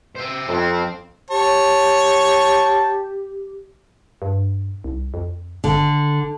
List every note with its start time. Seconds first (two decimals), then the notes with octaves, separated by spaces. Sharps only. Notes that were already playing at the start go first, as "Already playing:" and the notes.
0.15 C5 E5
0.49 F2 C4
1.30 G4 C#5 A5
4.22 G2
4.84 C2
5.14 F2
5.64 G#1 D3